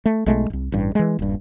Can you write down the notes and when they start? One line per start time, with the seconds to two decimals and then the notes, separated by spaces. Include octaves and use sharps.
0.05 A3
0.26 B1 G#3 A3
0.50 D1 C2
0.72 A1 G2
0.95 E3 G#3
1.19 D#1 G2